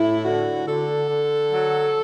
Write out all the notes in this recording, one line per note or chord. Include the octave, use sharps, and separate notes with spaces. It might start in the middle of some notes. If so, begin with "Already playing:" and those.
Already playing: A2 E4
D3 F#4
D3 A4
D3
F#3